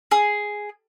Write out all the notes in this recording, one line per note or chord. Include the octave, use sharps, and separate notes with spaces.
G#4